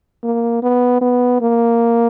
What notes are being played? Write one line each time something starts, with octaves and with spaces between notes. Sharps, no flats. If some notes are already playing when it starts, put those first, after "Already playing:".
A#3
B3
B3
A#3